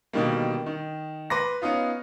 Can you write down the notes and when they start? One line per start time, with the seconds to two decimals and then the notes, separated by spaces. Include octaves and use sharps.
0.13 B2 D3 D#3 G3 A#3
0.66 D#3
1.30 B4 C6 D6 A#6
1.62 B3 C#4 D#4 F4